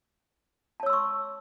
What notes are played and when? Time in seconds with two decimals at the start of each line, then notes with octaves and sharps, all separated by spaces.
0.80 A5
0.83 C#5
0.86 E6
0.90 C6
0.93 C#6